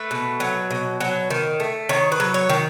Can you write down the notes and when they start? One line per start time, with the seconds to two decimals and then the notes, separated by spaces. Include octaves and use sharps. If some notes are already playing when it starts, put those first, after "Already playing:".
Already playing: A3 B4
0.11 B2
0.40 F#3
0.71 B2
1.00 F#3
1.30 D#3
1.60 A3
1.89 D#3 C#5
2.12 B4
2.20 F#3
2.34 C#5
2.49 D#3